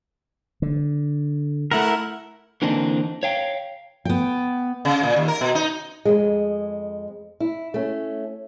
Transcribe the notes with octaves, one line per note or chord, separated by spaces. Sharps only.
D3
A3 E4 A#4 F#5
D3 E3 A#3 C4 D4 D#4
C#5 F5 G5
B3 G5
C#3
A#2
D#2
A#4
B2
D#4
F2 G#2 G#3
E4
A3 C#4